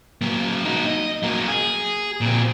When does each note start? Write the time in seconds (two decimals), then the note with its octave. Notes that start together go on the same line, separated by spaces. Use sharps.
0.22 F#3 A#3
0.65 D#4 F#4
0.86 D#5
1.23 F#3 A#3
1.48 G#4
2.21 A#2 C4